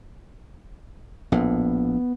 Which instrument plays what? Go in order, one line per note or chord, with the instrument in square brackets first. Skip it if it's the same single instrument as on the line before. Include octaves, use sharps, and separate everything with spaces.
[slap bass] A#1 A2 [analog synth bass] B3